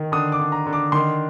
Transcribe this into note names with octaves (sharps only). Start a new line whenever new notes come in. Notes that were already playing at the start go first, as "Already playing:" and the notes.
Already playing: D#3
D3 D#6
D6
D3
A#5
D3
D6
D#3 C6